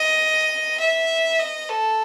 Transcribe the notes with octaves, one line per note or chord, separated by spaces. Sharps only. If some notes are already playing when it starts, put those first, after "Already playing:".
Already playing: D#5
E5
D#5
A4